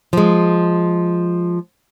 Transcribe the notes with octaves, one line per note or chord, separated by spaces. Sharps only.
F3 G#3